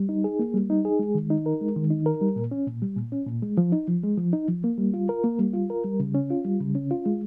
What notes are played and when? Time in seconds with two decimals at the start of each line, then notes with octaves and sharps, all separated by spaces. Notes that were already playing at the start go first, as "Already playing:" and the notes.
Already playing: G3
0.09 D#4
0.24 G#4
0.39 A#3
0.54 G3
0.70 D#4
0.85 G#4
0.99 G#3
1.15 D#3
1.30 D#4
1.46 A#4
1.61 G#3
1.76 D#3
1.90 D#4
2.06 A#4
2.21 G3
2.36 A#2
2.51 C#4
2.67 A#2
2.82 G3
2.97 A#2
3.12 C#4
3.27 A#2
3.42 G#3
3.57 F3
3.72 D#4
3.88 F3
4.03 G#3
4.18 F3
4.33 D#4
4.48 F3
4.64 A#3
4.78 G3
4.94 F4
5.09 A#4
5.24 A#3
5.39 G3
5.54 F4
5.70 A#4
5.84 G3
6.00 C#3
6.15 C#4
6.30 F4
6.45 G3
6.60 C#3
6.75 C#4
6.91 F4
7.06 G#3